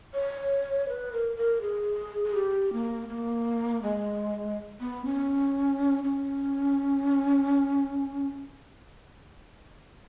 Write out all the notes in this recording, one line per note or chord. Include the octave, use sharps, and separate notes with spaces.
C#5
B4
A#4
A#4
G#4
G#4
G4
A#3
A#3
G#3
B3
C#4
C#4